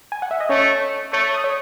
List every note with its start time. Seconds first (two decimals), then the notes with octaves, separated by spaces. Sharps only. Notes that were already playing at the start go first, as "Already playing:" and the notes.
0.12 G#5
0.22 F#5
0.31 E5
0.40 D#5
0.49 A3 C#4 C#5
1.12 A3 C#5 C#6
1.34 D#6
1.44 C#5 C#6